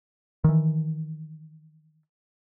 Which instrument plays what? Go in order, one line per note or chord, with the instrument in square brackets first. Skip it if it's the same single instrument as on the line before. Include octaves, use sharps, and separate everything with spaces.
[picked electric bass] D#3 E3